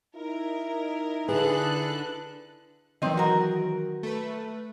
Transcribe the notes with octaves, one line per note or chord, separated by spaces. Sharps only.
D#4 E4 A#4
D3 G#4 A4 B4 F#6
D#3 E3 F#3 C4 D#5
F#4 A#4
A3 B4